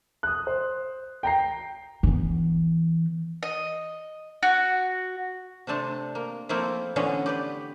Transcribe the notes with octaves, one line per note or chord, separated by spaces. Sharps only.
D#6 F#6
C5
G5 A#5 C7
E3 B3
D#5
F#4
C3 A3 C4 D4 A5
A#3
F3 A3 A#3 C4 E4 F4
D3 E3 B3 C#4 D4
G4 B4 D5